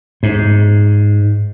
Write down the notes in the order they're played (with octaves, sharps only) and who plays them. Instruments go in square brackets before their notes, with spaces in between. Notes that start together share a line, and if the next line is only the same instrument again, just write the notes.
[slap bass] G#2